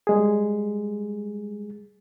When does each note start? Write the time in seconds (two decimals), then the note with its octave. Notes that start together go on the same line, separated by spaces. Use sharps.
0.07 G3 G#3 G#4